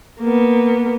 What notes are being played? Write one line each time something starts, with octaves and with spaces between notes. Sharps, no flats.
A#3 B3